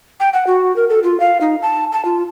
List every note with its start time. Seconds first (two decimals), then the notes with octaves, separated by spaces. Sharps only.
0.20 G5
0.33 F#5
0.47 F#4
0.76 A#4
0.89 A4
1.03 F4
1.20 F5
1.41 D#4
1.62 A5
1.92 A5
2.05 F4